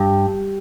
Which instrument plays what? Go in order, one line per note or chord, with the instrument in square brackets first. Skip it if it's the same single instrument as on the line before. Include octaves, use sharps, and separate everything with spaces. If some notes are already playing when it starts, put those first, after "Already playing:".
Already playing: [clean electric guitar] G2 [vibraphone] G3 G4